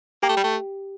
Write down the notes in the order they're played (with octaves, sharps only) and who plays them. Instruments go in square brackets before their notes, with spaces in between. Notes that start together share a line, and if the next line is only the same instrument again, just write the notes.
[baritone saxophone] A#3 [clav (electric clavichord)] G4
[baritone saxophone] A3
G3
A3